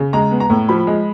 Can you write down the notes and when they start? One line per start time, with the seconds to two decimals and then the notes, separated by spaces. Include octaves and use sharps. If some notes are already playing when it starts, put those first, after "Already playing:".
Already playing: C#3
0.13 G#3 A#5
0.31 B3
0.40 A#5
0.50 A2
0.69 F3 B5
0.87 G#3